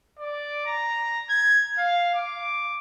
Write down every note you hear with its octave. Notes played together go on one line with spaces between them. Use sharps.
D5
A#5
G#6
F5
D6